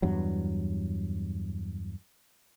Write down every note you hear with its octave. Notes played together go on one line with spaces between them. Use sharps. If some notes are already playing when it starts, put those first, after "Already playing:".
E2 G2 F#3